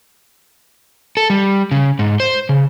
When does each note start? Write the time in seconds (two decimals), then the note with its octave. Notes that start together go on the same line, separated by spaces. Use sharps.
1.17 A4
1.30 G3
1.71 C#3
1.99 G#2
2.20 C5
2.49 C#3